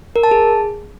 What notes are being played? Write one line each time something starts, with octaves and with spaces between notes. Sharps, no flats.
A#4
A5
G#4